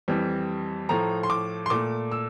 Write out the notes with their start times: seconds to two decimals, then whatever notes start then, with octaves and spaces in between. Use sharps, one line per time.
0.08 F2 E3 G3
0.89 A2 F3 A3 A#5
1.23 C6
1.30 D6
1.66 C6
1.70 A#2 A3 D6
2.11 E6